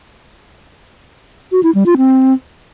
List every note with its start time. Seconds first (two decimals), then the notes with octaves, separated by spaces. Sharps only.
1.52 F#4
1.63 E4
1.75 G3
1.86 F4
1.98 C4